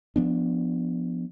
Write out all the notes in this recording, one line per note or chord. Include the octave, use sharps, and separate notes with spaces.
F3 B3 D4